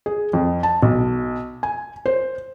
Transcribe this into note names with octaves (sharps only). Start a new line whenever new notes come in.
G#4
F2
A5
B1
G#5
C5